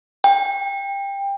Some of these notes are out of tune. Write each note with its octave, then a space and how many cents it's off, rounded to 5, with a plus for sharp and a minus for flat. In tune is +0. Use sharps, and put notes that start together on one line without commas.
G5 +20